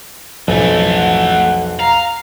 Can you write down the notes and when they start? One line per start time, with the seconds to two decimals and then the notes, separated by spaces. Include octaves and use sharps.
0.48 B1 F2 E3 A3 G#5
0.92 F#5
1.79 F5 A#5